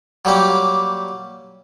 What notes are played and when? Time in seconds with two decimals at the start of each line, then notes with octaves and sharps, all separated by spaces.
0.25 F#3 G3 A#3 G4